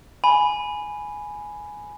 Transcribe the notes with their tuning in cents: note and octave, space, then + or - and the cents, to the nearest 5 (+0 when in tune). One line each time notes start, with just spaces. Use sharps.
G#5 +5 B5 +0